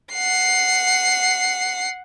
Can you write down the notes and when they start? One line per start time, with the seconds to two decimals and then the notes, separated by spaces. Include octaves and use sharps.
0.14 F#5 C7